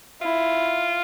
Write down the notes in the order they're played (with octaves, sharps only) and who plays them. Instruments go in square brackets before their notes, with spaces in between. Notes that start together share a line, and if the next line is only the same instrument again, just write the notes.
[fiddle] E4 [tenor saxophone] F4